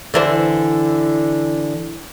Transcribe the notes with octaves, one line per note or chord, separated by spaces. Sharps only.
D3 E3 C5